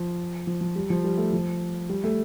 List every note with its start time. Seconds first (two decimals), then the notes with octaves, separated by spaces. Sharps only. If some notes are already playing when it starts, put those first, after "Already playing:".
Already playing: F3
0.47 F3
0.61 F3
0.76 G3
0.90 F3
1.04 G3
1.18 A3
1.33 F3
1.89 G3
2.04 A3